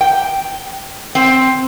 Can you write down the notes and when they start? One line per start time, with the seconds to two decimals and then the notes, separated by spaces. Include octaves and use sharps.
0.01 G5
1.15 C4